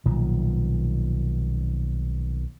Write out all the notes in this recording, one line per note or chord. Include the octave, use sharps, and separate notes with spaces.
B1 A#2 D#3 F3